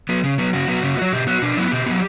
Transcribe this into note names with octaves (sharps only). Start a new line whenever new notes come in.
F#3 B3
C#3
F#3 B3
C#3 F#4
F#3 B3
C#3
B3
F#3
B2 G4
F#3 B3 F#4
B2 D4
F#3 B3 E4
B2 G4
F#3 B3